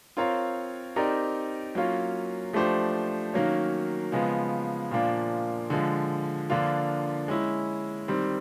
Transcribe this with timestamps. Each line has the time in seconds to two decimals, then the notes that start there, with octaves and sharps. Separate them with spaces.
0.17 C4 F4 A#4 C#5 F5
0.96 C4 D#4 G4 A#4 D5
1.75 F#3 A#3 C#4 F4
2.53 F3 A3 D4 G4 C5
3.34 D#3 F#3 A#3 C#4
4.12 C#3 F3 G#3 B3
4.91 A#2 F3 A#3 D4
5.70 D3 F3 G#3
6.50 D3 F3 A#3 D4 F4
7.28 G#3 C#4 E4
8.08 D#3 G3 C4